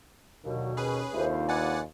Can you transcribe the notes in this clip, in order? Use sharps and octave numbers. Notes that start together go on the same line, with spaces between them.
D#2 B2 D3 F#3
C#4 G#4 B4
D#2 C3 D4 E4 F4 A4 C5
B4 D5 D#5 F#5 G#5